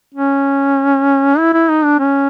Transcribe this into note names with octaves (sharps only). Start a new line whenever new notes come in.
C#4
E4
E4
D#4
D4
C#4